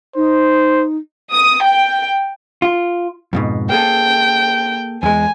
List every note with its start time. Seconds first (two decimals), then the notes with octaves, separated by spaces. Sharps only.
0.16 D#4 C5
1.32 D#6
1.63 G5
2.62 F4
3.33 F2 G#2 B2
3.70 A#3 G#4 A4 G5
5.03 E2 G#3 G#5